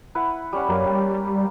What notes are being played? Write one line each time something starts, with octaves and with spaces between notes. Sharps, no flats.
E4 B4 F#5
G3 C#4 F#5
F#2 A#3 B4 F5
G3